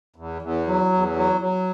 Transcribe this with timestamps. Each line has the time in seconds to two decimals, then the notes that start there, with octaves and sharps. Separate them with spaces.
0.16 E2
0.42 E2
0.67 F#3
0.92 E2
1.16 F#3
1.41 F#3